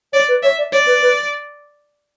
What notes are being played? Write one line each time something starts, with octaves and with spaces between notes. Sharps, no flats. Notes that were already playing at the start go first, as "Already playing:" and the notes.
C#5 D5
B4
C#5 E5
D5
C#5 D5
B4
B4